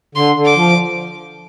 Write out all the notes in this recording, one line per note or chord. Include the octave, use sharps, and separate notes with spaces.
D3 C6
D3
D6
F3